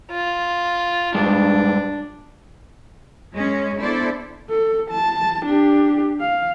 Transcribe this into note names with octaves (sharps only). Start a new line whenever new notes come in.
F4
G2 G#3 D4
F#2 G#3 C#4
B3 D4 E4 A4 C5 D5
A4
A5
D4 G4
F5